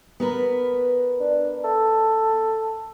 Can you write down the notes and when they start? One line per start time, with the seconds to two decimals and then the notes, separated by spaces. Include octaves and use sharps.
0.20 B3 A#4 B4
1.20 D4
1.64 A4